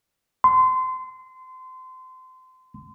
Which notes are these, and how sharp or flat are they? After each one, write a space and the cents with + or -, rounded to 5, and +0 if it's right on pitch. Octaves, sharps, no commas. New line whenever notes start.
C6 -25